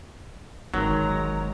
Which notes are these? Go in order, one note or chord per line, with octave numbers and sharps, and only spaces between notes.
G1 D#3 F#3 G#3 A#5